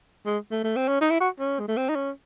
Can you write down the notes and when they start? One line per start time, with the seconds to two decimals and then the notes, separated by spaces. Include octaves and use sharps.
0.26 G#3
0.51 A3
0.64 A3
0.76 C4
0.88 C#4
1.01 D#4
1.10 E4
1.20 F#4
1.39 C#4
1.60 G#3
1.68 A3
1.77 C4
1.89 D#4
1.95 C#4